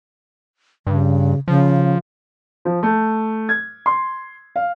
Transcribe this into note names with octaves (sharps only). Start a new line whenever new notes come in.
G2 C#3
C#3 F3
F3
A3
G#6
C6
F5